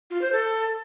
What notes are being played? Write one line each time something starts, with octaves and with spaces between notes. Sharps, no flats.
F4
C5
A4